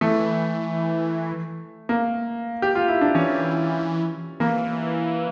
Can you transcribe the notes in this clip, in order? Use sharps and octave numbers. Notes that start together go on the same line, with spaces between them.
E3 A3
A#3
G4
F4
E4
D4
E3 C#4
E3 A#3